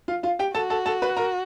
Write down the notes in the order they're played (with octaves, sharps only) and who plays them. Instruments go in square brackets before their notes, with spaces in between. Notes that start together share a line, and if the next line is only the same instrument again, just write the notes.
[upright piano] F4 F5
F4 F5
G4 G5
[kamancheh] F#4 [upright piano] A4 A5
[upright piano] A4 A5
A4 A5
B4 B5
A#4 A#5